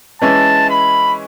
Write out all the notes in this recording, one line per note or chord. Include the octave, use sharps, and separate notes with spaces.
E3 G#3 C#4 E4 A5
B5